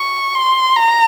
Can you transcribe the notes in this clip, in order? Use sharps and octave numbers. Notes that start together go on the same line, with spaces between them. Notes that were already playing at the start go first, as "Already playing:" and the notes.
Already playing: C#6
C6
A#5